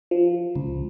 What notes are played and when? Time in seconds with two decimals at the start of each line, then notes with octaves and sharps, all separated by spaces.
0.11 F3
0.56 C#2